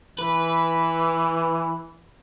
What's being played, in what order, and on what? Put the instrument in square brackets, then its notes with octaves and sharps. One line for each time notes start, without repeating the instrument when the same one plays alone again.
[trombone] E3 [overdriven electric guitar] B4